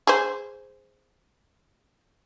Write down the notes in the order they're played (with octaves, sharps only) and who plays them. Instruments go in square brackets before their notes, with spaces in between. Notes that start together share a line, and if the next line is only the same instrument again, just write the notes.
[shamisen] G#4 C5